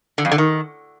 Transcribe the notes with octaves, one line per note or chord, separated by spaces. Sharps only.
D3
F2
D3
D#3